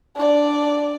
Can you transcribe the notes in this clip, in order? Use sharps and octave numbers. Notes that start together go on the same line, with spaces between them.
D4 D5